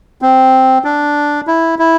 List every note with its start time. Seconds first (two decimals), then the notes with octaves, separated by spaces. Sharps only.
0.22 C4
0.84 D4
1.47 E4
1.79 E4